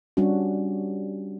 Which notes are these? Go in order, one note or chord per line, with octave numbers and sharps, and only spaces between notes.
G3 C#4 D4 F#4